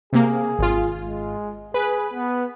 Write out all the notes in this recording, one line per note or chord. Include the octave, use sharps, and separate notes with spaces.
C3 A#3 G#4
G#1 F4
G#3
G#4 B4
B3